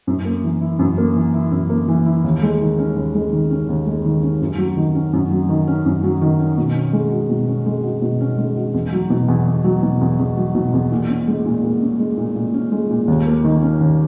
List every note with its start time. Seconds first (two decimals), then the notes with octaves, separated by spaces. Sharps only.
0.07 F#2
0.25 A#3
0.44 E3
0.61 E4
0.79 F#2
0.97 A#3
1.16 E3
1.34 E4
1.52 F#2
1.69 A#3
1.88 E3
2.06 E4
2.24 D#2
2.42 G#3
2.60 D#3
2.79 C#4
2.96 D#2
3.14 G#3
3.33 D#3
3.50 C#4
3.69 D#2
3.86 G#3
4.05 D#3
4.23 C#4
4.41 F#2
4.58 F#3
4.77 D#3
4.95 C#4
5.13 F#2
5.31 F#3
5.49 D#3
5.67 C#4
5.86 F#2
6.04 F#3
6.22 D#3
6.39 C#4
6.58 B2
6.76 C#4
6.93 G#3
7.11 F#4
7.30 B2
7.48 C#4
7.66 G#3
7.83 F#4
8.02 B2
8.20 C#4
8.38 G#3
8.57 F#4
8.74 E2
8.92 F#3
9.10 B2
9.28 E2
9.46 E2
9.64 F#3
9.83 B2
10.01 E2
10.19 E2
10.37 F#3
10.55 B2
10.73 E2
10.91 A#2
11.09 C#4
11.27 G#3
11.45 A#2
11.64 A#2
11.82 C#4
11.99 G#3
12.17 A#2
12.36 A#2
12.54 C#4
12.72 G#3
12.90 A#2
13.08 D#2
13.26 A#3
13.44 D#3
13.62 C#4
13.81 D#2